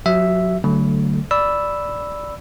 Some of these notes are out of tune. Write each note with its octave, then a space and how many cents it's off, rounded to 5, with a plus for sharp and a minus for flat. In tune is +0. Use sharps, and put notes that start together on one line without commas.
F#3 -30 F#4 +40 E5 +0
D3 +0 F#3 +35 A3 +15
D5 +0 B5 +0 E6 +0